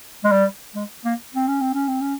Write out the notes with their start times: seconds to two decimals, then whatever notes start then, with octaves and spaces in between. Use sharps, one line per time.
0.24 G#3
0.32 G3
0.75 G#3
1.05 A#3
1.34 C4
1.48 C#4
1.61 C4
1.74 C#4
1.88 C4
2.01 C#4